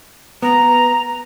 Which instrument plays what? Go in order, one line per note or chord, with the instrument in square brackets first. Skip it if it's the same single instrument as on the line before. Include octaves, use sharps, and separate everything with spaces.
[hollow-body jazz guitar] B3 [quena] A#5